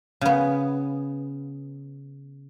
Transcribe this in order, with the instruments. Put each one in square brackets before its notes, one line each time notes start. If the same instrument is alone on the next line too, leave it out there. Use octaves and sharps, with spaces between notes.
[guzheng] C#3 B3